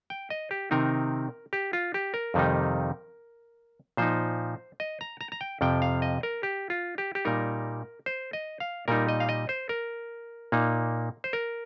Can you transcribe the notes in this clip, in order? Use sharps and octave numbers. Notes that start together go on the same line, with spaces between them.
G5
D#5
G4
C3 D#3 C4 D#4 A#4
G4
F4
G4
A#4
F2 C3 D#3 G3 D#4
A#2 F3 D#4 C5
D#5
A#5
A#5
A#5
G5
F2 C3 F3 G5
F5
D#5
A#4
G4
F4
G4
G4
A#2 G3 D#4 A#4
C5
D#5
F5
A#2 G3 D#4 A#4
D#5
F5
D#5
C5
A#4
A#2 A#3 D#4
C5
A#4